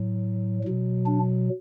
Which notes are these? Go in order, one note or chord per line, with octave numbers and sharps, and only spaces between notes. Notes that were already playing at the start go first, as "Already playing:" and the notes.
Already playing: A2 F#3
B2 F#3
D4